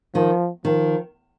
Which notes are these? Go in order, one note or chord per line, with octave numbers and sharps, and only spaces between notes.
D#3 F3
D#3 F3